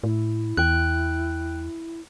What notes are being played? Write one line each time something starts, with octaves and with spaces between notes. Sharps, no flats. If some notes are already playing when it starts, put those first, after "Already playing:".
A2 E4
E2 G5 F#6